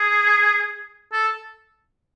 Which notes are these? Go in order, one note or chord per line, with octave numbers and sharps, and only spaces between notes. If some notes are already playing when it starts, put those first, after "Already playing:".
Already playing: G#4
A4